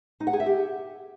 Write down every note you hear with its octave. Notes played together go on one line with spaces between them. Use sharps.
D#4
F#5
G#4
E5
G4